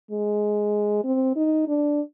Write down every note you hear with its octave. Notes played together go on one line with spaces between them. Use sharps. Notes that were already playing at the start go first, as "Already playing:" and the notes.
G#3
C4
D#4
D4